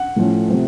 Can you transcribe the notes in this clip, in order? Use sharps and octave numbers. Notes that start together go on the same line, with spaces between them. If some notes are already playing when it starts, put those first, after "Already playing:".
Already playing: F#5
A2 F3 A3 C#4
C3 F3 A3 C4